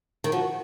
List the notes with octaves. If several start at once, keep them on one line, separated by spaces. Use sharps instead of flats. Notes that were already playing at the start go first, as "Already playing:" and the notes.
D#3
F3 F#4